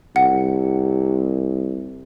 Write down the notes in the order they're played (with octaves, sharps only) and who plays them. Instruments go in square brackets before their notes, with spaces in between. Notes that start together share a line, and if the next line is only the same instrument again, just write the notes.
[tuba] C2 [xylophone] F#5